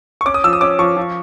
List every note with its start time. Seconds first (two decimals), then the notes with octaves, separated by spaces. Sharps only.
0.21 C#6
0.26 C#4 D6
0.34 D#6
0.44 F3 E6
0.53 D#6
0.61 C#4 D6
0.79 F3 C#6
0.97 F3